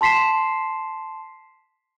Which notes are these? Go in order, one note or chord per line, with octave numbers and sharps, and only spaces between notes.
A5 C6 B6 C7 E7